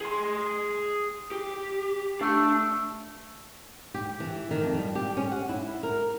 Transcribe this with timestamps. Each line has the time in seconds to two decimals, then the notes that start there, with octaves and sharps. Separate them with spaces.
0.01 G#4 C6
1.31 G4
2.21 A3 D4
3.94 G4
4.20 E3
4.51 D#3
4.64 F2
4.78 G3
4.95 G4
5.17 C#4
5.31 F#5
5.49 E4
5.83 A#4